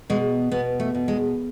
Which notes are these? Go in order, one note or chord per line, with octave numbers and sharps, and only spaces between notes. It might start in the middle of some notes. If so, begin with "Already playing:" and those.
B2 G#3
B2 B3
A3
B2
G#3